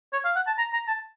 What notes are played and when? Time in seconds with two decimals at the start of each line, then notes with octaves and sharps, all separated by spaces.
0.13 C#5
0.25 F5
0.36 F#5
0.47 A5
0.58 A#5
0.73 A#5
0.88 A5